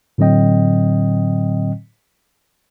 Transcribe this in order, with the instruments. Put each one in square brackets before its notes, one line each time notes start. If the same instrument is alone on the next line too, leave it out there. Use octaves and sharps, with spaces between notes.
[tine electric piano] A2 D3 F#3 C4 D#5 G5